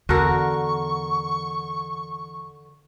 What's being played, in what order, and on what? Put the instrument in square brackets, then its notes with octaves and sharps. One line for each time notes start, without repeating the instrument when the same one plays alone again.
[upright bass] E2 [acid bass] D3 [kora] F#4 A4 A#4 [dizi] C#6